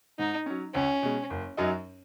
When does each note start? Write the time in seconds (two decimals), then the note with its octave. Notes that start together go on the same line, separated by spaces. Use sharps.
0.19 G#2 D#4
0.46 F#3 C#4
0.74 C#2 C#4
1.03 B2 G#3
1.30 F#1
1.57 F#2 F#3 D#4